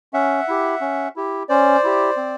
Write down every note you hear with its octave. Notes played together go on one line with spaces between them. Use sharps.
C#4 E5 F#5
E4 G4
C#4
E4 G4
C#4 C5 D5
E4 G4
C4